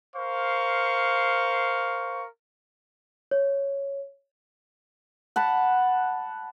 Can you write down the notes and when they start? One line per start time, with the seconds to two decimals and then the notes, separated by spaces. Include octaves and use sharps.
0.16 A#4 C5 F5 C#6
3.31 C#5
5.36 F#5 A5 B5